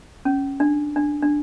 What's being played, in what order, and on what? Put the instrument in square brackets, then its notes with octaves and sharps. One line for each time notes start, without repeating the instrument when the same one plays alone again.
[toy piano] C#4
D4
D4
D4